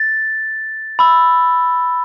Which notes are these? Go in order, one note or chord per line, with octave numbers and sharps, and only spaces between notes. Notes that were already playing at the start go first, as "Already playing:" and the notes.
Already playing: A6
B5 E6